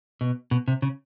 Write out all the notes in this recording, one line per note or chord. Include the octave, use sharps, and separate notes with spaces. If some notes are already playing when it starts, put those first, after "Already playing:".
B2
B2
C3
C#3